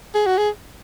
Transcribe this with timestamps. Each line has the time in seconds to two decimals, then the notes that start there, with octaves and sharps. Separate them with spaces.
0.14 G#4
0.26 F#4
0.37 G#4